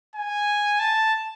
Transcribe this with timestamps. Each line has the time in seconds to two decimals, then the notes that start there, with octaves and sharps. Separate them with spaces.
0.16 G#5
0.80 A5